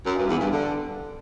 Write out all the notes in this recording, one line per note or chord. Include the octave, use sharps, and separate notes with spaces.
F#2
G2
E2
G2
D3